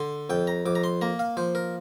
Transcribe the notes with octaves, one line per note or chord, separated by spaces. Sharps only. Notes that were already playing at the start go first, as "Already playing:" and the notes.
Already playing: D3 C6
F2 G5
A#5
F2 D6
A#5
C6
A#3 A#5
F5
F3 C5
A#4